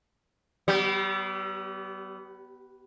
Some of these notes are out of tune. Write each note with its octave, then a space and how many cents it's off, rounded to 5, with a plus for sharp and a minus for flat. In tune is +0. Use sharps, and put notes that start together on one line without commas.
G3 -40 B3 +0